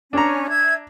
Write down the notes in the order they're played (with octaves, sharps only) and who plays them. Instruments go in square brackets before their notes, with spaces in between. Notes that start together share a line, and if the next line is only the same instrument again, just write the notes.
[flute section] C#4 [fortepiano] D4 A#5
[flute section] E5 G#6